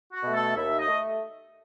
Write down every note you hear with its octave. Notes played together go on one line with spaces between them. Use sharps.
F#4
B2 A3
A4
D#2 E5
D#5
A3